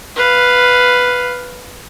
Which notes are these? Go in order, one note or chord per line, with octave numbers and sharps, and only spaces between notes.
B4 F5